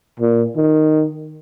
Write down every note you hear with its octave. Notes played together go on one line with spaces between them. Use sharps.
A#2
D#3